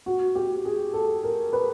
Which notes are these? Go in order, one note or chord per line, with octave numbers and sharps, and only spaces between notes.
F#4
G4
G#4
A4
A#4
B4